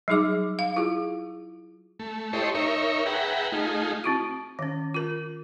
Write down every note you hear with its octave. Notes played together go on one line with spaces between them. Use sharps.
F#3 G3 D#4 G#4 D6
F5
E4 F4 G#4
A3
E4 G4 A4 C5 C#5 D#5
D#4 A#4 C#5 E5
G#4 B4 E5 F#5 G5 A#5
A3 D#4 F4 G#4
C4 E4 F#4
D#3 C#4
F4 A#4